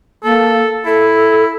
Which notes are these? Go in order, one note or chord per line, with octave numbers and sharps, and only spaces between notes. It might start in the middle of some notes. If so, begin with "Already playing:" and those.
A#3 A4
E4 A4